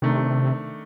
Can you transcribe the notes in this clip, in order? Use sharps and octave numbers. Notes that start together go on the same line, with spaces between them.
C3 D#3 A3 D4